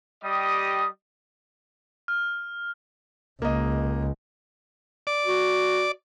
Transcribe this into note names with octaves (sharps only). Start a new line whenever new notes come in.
G3 G4 D#5 D#6
F6
C#2 A#3 D#5
D5
F#4